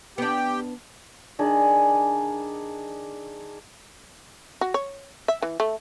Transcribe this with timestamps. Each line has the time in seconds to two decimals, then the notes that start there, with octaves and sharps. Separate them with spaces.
0.18 B3 D4 G4 G5
1.39 D#3 D4 G#4
4.61 F#4
4.74 C#5
5.28 E5
5.42 E3
5.60 A3